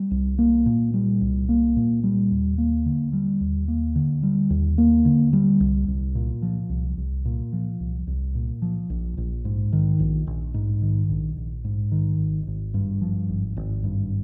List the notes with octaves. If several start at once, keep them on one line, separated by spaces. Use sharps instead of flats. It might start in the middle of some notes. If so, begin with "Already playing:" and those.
Already playing: G3
C2
A#3
A#2
G3
C2
A#3
A#2
G3
D#2
A#3
D3
G3
D#2
A#3
D3
G3
D#2
A#3
D3
G3
C2
C2
A#2
F3
C2
C2
A#2
F3
C2
C2
A#2
F3
A#1
A#1
G#2
D#3
A#1
A#1
G#2
D#3
A#1
A#1
G#2
D#3
G#1
G#1
G2
F3
G#1
G#1
G2